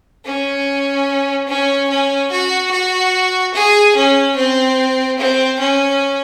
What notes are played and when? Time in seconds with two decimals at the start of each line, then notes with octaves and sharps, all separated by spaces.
0.25 C#4
1.48 C#4
1.90 C#4
2.31 F#4
2.71 F#4
3.54 G#4
3.95 C#4
4.36 C4
5.18 C4
5.59 C#4